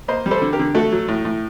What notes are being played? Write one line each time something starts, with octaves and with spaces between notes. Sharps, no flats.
A#3 C5 D#5
G3
A4 C5
D3
G4 A#4
D3
A3 F#4 A4
F#3
A2
A2